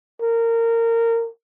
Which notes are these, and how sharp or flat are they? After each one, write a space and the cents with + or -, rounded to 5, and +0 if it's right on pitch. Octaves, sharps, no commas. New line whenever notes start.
A#4 -20